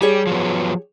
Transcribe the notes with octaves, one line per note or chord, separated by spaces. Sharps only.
G3 G4 G#4 C#5
F3 F#3 B3